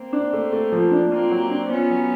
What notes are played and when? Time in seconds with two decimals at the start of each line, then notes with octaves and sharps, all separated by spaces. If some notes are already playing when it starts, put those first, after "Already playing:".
Already playing: A#3 C4
0.13 D4
0.33 A3
0.52 A3
0.72 F3
0.92 D4
1.11 A#3 C4 F4
1.31 F#3
1.50 D4
1.70 B3 C#4 F4
1.90 F#3